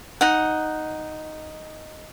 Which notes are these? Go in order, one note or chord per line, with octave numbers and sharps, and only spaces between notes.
D#4 F#5